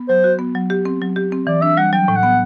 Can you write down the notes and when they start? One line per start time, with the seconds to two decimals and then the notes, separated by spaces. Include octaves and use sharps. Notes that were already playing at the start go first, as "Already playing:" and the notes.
Already playing: B3
0.09 F#3 C5
0.24 F#4
0.39 B3
0.55 F#3
0.70 G4
0.85 C4
1.01 F#3
1.16 G4
1.32 C4
1.47 E3 D5
1.62 D4 E5
1.77 G3 F#5
1.93 F#3 G5
2.08 A2
2.16 F#5
2.23 B3